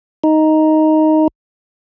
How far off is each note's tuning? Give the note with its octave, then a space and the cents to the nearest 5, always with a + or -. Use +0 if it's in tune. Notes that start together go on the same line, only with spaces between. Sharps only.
D#4 +5